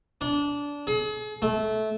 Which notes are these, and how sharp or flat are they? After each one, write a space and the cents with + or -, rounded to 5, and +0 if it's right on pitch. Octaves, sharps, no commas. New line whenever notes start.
D4 -20
G#4 +40
A3 -20